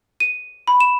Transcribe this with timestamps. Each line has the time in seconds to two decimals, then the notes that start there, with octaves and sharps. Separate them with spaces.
0.20 D#7
0.67 B5
0.80 E7